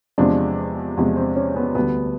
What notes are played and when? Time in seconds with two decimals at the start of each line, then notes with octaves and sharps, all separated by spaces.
0.18 E2 C3 F3 G#3 D4
0.97 E2 C3 F3 G#3
1.16 C4
1.36 C#4
1.56 B3
1.75 D2 D3 G3 B3